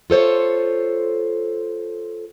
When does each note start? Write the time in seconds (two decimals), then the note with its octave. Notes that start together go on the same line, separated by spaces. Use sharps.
0.10 F4 A4 C5 C#5